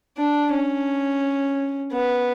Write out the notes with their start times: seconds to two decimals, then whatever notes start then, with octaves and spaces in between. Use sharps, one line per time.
0.17 D4
0.52 C#4
1.92 B3